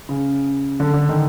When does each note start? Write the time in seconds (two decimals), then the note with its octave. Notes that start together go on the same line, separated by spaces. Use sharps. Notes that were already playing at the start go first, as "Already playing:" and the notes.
0.09 C#3
0.80 D3
0.93 D3
1.09 D#3